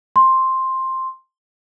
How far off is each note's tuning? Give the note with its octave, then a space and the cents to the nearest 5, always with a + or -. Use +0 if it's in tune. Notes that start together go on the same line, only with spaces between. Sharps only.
C6 +5